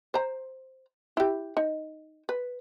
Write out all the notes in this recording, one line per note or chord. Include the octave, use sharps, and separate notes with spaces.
C5 A#5
E4 G4
D#4
B4